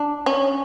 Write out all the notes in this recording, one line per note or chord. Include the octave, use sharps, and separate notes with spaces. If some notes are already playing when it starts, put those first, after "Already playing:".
Already playing: D4
C#4